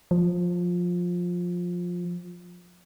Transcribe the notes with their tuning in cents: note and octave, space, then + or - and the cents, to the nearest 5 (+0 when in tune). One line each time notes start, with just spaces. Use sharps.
F3 +15